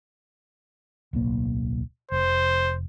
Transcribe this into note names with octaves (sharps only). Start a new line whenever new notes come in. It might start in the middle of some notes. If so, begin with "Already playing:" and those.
D1 B1 A#3
F1 C5